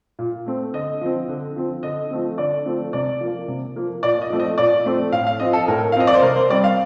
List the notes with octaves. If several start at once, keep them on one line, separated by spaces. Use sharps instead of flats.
A#2
A3 C4
D3 D#5
F3 C4
D3
F3 C4
D3 D#5
F3 A3 C4
D3 D5
F3 A3 C4
C3 D5
F3 A#3
C3
F3 A#3
A#2 D5
D#5
F3 A3 C4
D#5
A#2 D5
F3 A3 C4
A2 F5
F5
F3 C4 D#5
A4
A2 A#4
F5
F3 C4 D#5
D5
C5
C3 A#4
C5
G3 C4 D5
F5